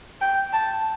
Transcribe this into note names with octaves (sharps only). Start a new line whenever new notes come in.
G5
A5